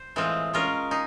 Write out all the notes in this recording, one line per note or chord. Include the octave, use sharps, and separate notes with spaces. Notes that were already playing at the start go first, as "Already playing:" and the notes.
Already playing: C5
A2 E3 G#3 C4 F4
G#3 C#4 F4 A#4
D#4 G#4